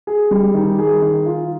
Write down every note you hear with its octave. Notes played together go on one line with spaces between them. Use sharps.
G#4
G3
D#3
G#4
D#3
F4